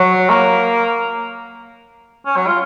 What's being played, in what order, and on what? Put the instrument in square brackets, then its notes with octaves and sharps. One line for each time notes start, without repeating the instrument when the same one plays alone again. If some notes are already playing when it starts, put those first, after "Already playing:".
Already playing: [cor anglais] F#3
A#3
C#4
F#3
F4